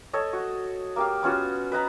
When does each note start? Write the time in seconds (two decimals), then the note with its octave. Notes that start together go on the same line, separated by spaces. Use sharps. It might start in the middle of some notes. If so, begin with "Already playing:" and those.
0.13 A4 C#5 D#5
0.33 F#4
0.96 A#3 G4 F5
1.22 B3 C#4 F4 F#4
1.72 B4 D#5 A#5 B5